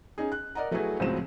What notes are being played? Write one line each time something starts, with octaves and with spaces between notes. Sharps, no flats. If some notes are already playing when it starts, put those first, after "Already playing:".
C#4 D#4 G#4
F#6
A#4 D5 D#5 F#5 A#5
F#3 A3 E4 F#4 G#4 B4
C#2 A2 F3 F#3 C4 E7